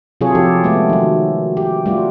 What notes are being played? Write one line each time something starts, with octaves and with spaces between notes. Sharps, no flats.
C3 F#3 F4 G#4 A4 C#5
F3 F4 G4 A4
G#3 A3 B3
D#3 F#3
G4
G3 A3 F4 F#4